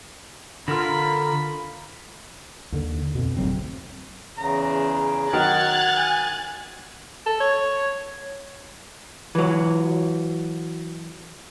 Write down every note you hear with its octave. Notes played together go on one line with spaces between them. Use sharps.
D3 F4 A#4 B5
D#2 D3
F2 B2
G#1 D2 F#3 C4
E2 C#3 A#5
D#3 F#3 F#5 F6 F#6 G#6 A6
G#5
A4
C#5
E3 F#3